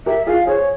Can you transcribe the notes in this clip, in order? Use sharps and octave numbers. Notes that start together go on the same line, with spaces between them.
G4 A#4 E5
F4 G#4 F5
G#4 C5 C#5